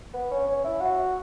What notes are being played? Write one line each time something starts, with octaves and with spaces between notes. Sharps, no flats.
B3
C#4
C#4
E4
F#4